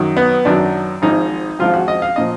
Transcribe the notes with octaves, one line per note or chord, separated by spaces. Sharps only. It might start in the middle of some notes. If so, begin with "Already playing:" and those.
Already playing: F#2 D#3 F#3
B3
F#2 D#3 F#3 D4
G#1 G#2 F3 D#4
G#1 G#2 F3 F4
F#4
D#5
F5
A#2 F3 D#5